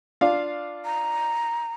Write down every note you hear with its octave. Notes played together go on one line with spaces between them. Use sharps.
D4 F4 F5
A#5